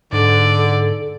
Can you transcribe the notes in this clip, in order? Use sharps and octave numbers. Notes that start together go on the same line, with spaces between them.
G#2 D3 A4 D5